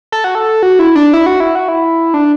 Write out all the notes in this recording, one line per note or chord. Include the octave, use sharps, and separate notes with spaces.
A4
F#4
A4
F#4
E4
D4
E4
F#4
E4
F#4
E4
D4